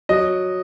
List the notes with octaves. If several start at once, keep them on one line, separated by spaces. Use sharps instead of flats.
F#3 D#5